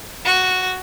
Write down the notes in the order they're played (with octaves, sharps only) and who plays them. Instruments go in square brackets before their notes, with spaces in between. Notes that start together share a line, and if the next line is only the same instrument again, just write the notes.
[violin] F#4